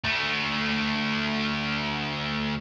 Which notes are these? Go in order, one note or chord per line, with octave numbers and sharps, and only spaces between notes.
D2 A3